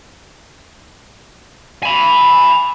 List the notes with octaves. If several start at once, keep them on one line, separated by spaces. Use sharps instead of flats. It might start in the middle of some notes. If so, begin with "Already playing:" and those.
G#5 B5